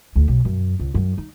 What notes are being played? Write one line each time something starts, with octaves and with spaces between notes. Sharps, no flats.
D2
B1
F#2
C#2
F#2
D#4